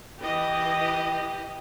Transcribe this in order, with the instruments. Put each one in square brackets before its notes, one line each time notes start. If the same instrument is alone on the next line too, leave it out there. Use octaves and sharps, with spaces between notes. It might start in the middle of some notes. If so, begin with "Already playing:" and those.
[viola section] E3 D#5 [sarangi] G4